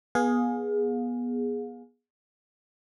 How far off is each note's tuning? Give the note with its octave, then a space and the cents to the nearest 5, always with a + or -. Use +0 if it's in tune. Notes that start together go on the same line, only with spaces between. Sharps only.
B3 -20 G#4 +0 F5 +35